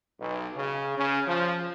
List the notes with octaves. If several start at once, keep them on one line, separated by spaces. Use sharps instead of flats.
B1
C#3
C#3
F3